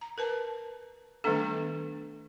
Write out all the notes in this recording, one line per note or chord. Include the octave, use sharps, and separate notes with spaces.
A#5
A#4 B4 A5
D#3 G3 A3 B3 D4 A4